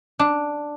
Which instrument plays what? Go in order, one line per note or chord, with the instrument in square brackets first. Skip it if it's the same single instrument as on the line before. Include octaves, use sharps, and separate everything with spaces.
[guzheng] D4